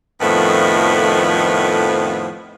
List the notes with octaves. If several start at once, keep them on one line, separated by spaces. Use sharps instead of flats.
F2 A2 D#3 F3 A3 B3